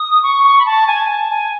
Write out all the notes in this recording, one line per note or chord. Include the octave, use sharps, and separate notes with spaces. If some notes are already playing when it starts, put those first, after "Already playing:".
Already playing: D#6
C#6
C#6
B5
A5
G#5
A5
G#5